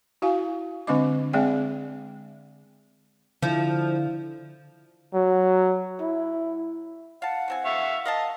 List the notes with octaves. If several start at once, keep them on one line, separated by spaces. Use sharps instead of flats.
E4 F#4 F5 G#5
D3 G#3 C4 D4 D#5 D6
G#3 C4 G#4 D5 E5 G5
D3 F3 E4
F#3
E4
F5 F#5 A5
E3 C4 G#5
E5 F5 C#6
A#4 D#5 F5 A5